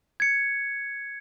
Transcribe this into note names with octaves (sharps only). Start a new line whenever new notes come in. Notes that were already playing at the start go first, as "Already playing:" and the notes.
G#6 C#7